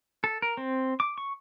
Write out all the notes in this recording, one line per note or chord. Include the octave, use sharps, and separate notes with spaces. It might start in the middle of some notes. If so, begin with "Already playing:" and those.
A4
A#4
C4
D6
C#6